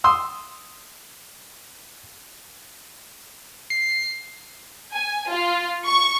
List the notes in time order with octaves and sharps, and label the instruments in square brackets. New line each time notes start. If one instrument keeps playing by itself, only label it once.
[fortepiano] C6 D#6 E6
[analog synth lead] C7
[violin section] G#5
F4
C#6